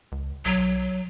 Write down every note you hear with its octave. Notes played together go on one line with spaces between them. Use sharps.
C#2
B1 F#3